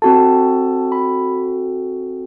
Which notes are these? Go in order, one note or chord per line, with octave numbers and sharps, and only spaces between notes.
C4 F#4 A4 A5
B5